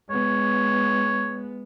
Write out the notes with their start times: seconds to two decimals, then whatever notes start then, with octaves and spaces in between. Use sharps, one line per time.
0.10 G#3 B3 C#5